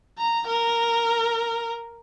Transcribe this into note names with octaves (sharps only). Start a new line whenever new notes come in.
A#5
A#4